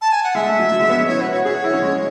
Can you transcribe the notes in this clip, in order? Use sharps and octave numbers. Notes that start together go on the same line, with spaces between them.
A5
G#5
F#5
G#3 E5
A3
F#3
F#3
G#3
B3
C#4
E4 C#5
F#4 B4
F#4 C#5
G#4 C#5
F#4
E4
C#4
G#3